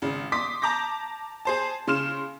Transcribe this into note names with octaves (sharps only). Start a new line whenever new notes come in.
G#1 C#3
C6 D6 D#6 B6
A5 A#5 D6 G6 A#6
G#4 C5 A5
C#3 C6 F6 E7